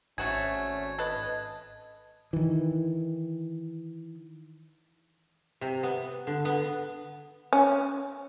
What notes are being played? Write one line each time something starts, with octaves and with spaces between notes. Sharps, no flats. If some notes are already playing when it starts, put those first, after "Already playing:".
G#1 A3 C#4 F#4 G#4 G#6
A4 B4 D#5
D#3 E3
C3
B3
D3
B3
C#4